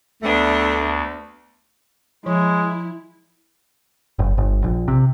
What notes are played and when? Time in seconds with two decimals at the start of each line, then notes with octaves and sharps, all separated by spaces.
0.23 D2 A3 B3 D4
2.26 F3 G#3 E4
4.19 F#1
4.38 G1
4.64 A#1
4.88 C3